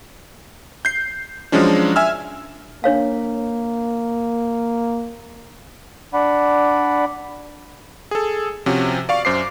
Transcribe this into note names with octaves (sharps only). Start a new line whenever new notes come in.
G6 C7
F3 F#3 G#3 C#4 D4
E5 G#5 E6 F6
A#3 D4 C#5 F5
D4 D5 F#5 B5
G#4 A4
C3 F3 C#4 F#4
D5 F5 C#6
F#2 C5 D6 C7